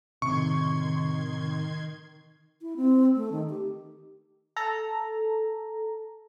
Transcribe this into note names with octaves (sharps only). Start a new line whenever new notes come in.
A2 C3 D#3 C6 C#6 G#6
E4
C4
A3
D#3
G4
A4 A#5